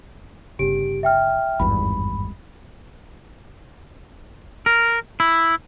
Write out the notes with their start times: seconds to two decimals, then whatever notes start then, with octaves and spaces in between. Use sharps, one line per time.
0.59 G1 C#3 G4 D7
1.03 E5 G5 F6
1.60 G#1 E2 G2 B5
4.66 A#4
5.20 E4